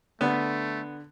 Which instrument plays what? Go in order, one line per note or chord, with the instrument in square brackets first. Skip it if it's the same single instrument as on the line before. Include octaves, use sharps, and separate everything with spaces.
[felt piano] D3 [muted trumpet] A3 [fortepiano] B3